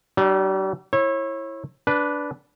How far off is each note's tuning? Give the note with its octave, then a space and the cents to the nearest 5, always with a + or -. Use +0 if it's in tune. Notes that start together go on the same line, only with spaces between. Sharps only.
G3 -40 D4 +25
E4 +0 C#5 -35
D4 -10 B4 +0